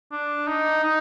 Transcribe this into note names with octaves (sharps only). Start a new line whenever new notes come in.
D4
D#4
D#4